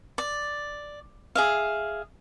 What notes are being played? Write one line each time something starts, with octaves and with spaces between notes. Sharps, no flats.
D5
G#4 E5 F5